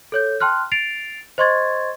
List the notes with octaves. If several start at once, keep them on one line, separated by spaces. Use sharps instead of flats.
A4 C#5 G6
G5 A5 C6 F6 F#6
A6 C7 D7 F7
C5 D#5 C6 C#6 G#6 A6